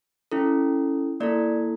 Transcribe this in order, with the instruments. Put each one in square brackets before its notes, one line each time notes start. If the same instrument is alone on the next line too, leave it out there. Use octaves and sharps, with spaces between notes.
[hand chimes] C#4 E4 A4
A#3 E4 A4 D5